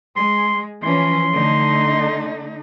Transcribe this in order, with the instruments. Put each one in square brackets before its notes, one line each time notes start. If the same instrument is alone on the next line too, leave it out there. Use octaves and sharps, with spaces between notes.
[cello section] G#3 [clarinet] C6
[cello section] E3 F3 C#4 [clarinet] C6
[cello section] D3 A3 D#4